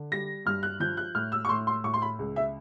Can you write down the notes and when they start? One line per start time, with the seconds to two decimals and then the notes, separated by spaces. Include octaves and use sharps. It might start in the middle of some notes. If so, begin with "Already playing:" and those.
Already playing: D3
0.12 G3 A#6
0.46 G2 F6
0.63 F#6
0.80 F3 G6
0.97 F#6
1.15 A2 F6
1.32 E6
1.45 C#6
1.49 A2 C6
1.67 C6
1.84 A2 C#6
1.94 C6
2.02 B5
2.19 C#2
2.36 E5